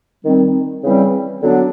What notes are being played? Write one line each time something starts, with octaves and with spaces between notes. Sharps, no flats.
D#3 G3 C4
C#3 E3 G3 C4
D3 F#3 B3 D4